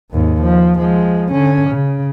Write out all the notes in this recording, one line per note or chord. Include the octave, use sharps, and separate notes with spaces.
D#2 G#2
F3
F3 G#3
D3 C#4
C#3